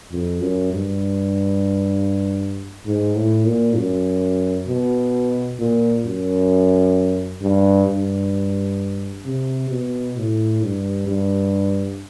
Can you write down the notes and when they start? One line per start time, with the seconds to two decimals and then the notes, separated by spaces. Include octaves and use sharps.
0.12 F2
0.41 F#2
0.73 G2
2.86 G#2
3.16 A2
3.46 A#2
3.77 F#2
4.68 B2
5.59 A#2
6.06 F#2
7.42 G2
7.88 G2
9.25 C3
9.70 B2
10.17 A2
10.62 G2
11.07 G2